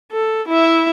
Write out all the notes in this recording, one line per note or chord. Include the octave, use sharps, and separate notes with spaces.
A4
E4 E5